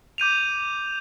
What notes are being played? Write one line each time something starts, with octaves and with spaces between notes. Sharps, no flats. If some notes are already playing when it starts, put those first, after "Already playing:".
D6 G6 D#7 F7